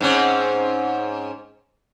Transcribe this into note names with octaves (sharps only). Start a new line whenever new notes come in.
G#2 C4 C#4